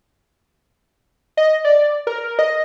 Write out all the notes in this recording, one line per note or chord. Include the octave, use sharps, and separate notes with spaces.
D#5
D5
A#4
D#5